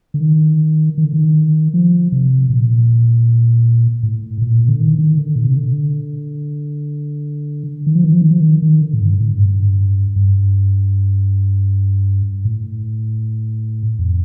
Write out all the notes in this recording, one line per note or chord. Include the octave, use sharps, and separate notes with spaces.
D3
D#3
D#3
D3
D#3
F3
C3
A#2
A2
A#2
D3
D#3
D#3
D3
A#2
C3
D3
D#3
F3
D#3
F3
D#3
F3
D#3
D#3
D3
A2
G2
A2
G2
G2
A2
F2